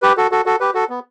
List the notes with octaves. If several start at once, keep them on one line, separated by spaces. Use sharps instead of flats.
G4 B4
F#4 A4
F#4 A4
F#4 A4
G4 B4
F#4 A4
B3